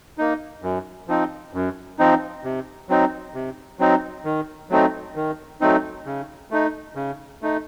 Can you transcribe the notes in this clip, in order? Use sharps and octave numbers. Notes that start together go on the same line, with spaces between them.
A#3 D#4
F#2
F3 C4 D#4
F#2
F3 C4 D#4
C3
F#3 C4 D#4
C3
F#3 C4 D#4
D#3
F#3 A3 C4 D#4
D#3
F#3 A3 C4 D#4
C#3
A3 D#4
C#3
A3 D#4